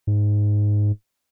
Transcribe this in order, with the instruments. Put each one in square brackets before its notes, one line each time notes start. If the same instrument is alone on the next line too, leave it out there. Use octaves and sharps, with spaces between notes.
[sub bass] G#2